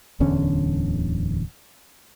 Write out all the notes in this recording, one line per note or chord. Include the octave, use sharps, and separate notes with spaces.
D1 E2 D3 C#4